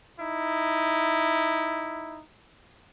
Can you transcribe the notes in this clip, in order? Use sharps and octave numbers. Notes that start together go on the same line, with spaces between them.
D#4 E4